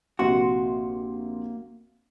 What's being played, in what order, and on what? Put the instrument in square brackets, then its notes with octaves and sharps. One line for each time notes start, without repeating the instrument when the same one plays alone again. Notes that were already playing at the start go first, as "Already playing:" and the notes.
[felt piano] A#1 C3 C6 [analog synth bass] A#3 [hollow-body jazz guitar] F#4